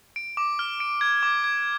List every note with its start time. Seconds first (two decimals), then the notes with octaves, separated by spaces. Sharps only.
0.16 D7
0.37 D6
0.59 F6
0.80 D7
1.01 G#6
1.23 D6
1.44 G#6